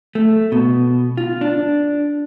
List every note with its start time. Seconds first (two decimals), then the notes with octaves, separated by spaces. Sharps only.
0.15 A3
0.52 B2
1.17 F4
1.41 D4